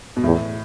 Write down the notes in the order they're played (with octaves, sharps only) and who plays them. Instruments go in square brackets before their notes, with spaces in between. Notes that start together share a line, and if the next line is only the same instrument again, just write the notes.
[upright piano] B2
[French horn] E2 [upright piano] A2